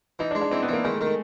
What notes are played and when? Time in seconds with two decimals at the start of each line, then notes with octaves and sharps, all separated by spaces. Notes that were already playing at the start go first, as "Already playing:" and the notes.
0.19 E3 D#4
0.31 D4
0.35 G#3
0.41 D4
0.51 E3 C4
0.62 B3
0.68 E3 A#3
0.84 D#3 G#3
0.95 A3
1.01 D#3
1.07 A3